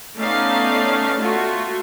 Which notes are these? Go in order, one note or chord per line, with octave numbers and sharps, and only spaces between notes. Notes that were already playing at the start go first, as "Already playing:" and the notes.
A3 B3 C#4 D#4 D5 F5
A3 F4 F#4